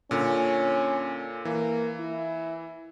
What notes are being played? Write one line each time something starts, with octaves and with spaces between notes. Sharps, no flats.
A#2 D3 C#4
E3 A#3
E4